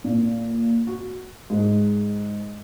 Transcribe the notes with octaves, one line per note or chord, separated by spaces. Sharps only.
A#2
F#4
G#2